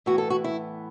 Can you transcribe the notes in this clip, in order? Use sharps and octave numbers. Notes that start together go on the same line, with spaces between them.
A2 E3 B3 F#4
A4
F#4
E4